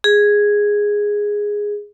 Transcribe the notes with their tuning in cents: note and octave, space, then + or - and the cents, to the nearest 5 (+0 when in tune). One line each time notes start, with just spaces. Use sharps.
G#4 -5